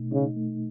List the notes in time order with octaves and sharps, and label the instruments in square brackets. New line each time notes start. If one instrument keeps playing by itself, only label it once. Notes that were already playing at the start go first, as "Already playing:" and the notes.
Already playing: [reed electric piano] B2 A3 D#4
[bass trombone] C#3 [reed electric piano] D#4
[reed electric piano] A3